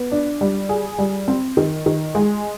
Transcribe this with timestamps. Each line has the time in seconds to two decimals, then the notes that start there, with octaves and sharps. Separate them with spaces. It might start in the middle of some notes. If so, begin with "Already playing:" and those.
Already playing: B3
0.12 D4
0.41 G3
0.69 G#4
0.98 G3
1.28 C4
1.57 D#3
1.86 D#3
2.15 G#3